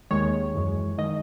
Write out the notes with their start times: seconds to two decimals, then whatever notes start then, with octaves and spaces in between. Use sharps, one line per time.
0.11 D#2 D#3 G#3 C#5
0.55 F#2 E3 G#3
0.98 D#3 G#3 D#5